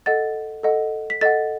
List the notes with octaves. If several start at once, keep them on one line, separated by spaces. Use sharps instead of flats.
A4 D#5 F#5 A6
A4 D#5 F#5
B6
A4 D#5 F#5 A6